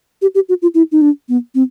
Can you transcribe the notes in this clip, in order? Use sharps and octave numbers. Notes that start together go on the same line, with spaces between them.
G4
G4
F#4
F4
E4
D#4
D4
B3
C4